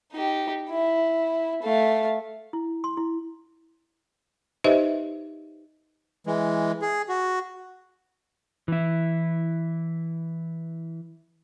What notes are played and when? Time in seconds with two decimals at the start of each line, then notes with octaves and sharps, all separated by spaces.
0.12 D#4 G4
0.70 E4
1.63 A3 F5
2.53 E4
2.84 C6
2.97 E4
4.64 D#4 G4 B4 C5 D#5 E5
6.27 E3 G#3
6.82 G#4
7.09 F#4
8.68 E3 E4